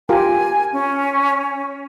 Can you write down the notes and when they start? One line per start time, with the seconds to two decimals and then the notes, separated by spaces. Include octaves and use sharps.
0.09 F4 G4 A#4 G#5
0.73 C#4